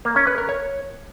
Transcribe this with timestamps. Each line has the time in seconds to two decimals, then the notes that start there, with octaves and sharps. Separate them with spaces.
0.05 A#3
0.16 C#4
0.27 B4
0.38 A#4
0.49 C#5